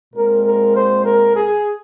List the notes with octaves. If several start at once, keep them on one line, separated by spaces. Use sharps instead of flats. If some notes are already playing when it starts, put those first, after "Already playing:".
A#2 G#3 C4 A#4
A#4
C5
A#4
G#4